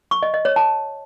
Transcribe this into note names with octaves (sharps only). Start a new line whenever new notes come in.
C#6
D#5
D#5
C#5
A5